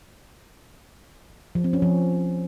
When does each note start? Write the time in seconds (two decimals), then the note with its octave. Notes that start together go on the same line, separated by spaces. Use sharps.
1.55 F3
1.64 C4
1.73 C#4
1.82 F3